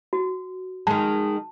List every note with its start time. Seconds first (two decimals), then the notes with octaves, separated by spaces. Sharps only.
0.13 F#4
0.87 D#3 G#3 A5